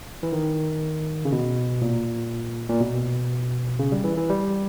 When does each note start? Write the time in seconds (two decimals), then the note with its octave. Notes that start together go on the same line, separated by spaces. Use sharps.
0.23 E3
0.32 D#3
1.25 C#3
1.32 B2
1.82 A#2
2.69 A#2
2.80 B2
3.79 C#3
3.92 G3
4.04 E3
4.17 E3
4.30 G3